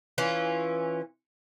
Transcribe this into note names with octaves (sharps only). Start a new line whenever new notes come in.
E3 C#4 F4